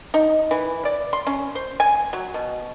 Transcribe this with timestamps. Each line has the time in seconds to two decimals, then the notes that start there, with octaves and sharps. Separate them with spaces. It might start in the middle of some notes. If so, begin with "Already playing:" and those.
0.14 D#4
0.51 E3
0.85 D5
1.13 C6
1.27 C#4
1.55 C5
1.80 G#5
2.13 F#3
2.34 B2